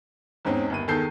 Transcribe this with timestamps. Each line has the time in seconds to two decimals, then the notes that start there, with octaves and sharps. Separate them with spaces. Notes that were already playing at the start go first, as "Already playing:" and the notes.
0.45 E2 G#2 C4 C#4 D#4
0.70 G1 D#2 D#7
0.88 E2 D#3 G#4 A4 G6 C7